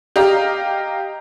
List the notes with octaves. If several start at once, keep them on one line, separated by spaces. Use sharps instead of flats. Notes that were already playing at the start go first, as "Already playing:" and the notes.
G4 D#5 F5 A#5